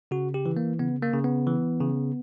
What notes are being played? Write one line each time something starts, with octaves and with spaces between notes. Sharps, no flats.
C#3 F#4
G4
E3
A#3
C#3 B3
A#3
C#3
B3
E3
C#3